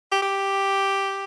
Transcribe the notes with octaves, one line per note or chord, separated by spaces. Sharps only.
G4
G4